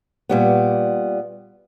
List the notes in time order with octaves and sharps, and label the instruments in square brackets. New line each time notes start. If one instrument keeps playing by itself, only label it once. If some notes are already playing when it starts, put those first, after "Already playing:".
[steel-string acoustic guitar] A#2 G3 B3